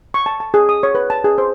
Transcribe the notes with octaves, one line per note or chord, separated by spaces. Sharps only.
C#6
A5
A5
G#4
D#6
C#5
B4
A5
G#4
C5